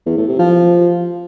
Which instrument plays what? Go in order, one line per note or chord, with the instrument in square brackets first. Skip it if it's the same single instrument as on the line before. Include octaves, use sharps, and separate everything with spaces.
[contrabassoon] E2
A2
C3
F3